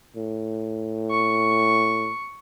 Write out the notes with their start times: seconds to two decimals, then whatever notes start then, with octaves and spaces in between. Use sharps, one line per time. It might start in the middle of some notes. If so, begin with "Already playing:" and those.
0.16 A2
1.11 C#6